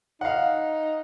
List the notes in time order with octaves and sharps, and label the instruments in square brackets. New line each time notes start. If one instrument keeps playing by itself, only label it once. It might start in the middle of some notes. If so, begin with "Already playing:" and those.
[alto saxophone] D#4 [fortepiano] F5 F#5